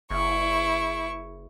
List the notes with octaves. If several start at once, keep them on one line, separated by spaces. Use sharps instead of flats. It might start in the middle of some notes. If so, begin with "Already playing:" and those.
F#1 E4 C#6